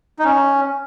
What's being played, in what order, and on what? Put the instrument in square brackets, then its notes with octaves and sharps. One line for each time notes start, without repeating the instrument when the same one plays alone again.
[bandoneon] D#4
C#4